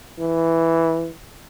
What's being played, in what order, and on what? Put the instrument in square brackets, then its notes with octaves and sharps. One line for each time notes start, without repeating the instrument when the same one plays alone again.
[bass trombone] E3